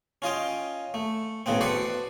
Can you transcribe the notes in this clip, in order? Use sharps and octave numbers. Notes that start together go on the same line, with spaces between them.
C#4 F4 D#5 G5
A3
B1 A2 C#3 B3 C4
F#4 A4 B4 C5 D5